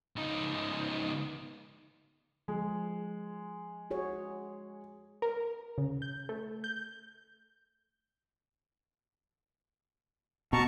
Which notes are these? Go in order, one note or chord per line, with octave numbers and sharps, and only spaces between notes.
C#2 D#4
F3 G#3
F#4 G#4 C#5
A#4
C#3
G6
A3
G6
B2 A5 A#5 C#6